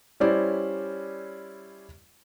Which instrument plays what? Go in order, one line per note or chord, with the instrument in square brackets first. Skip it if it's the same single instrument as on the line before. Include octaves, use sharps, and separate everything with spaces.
[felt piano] G3 C#4 E4 C5 D5